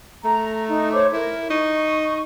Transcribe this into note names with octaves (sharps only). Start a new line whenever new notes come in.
A3 A#5
D#4
C5 C#5 D6
E4 A#4
D#4 C#6